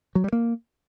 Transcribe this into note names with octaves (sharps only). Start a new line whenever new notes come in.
F#3
G3
A#3